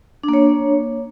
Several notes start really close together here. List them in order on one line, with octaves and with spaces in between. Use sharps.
D4 A#3 C#5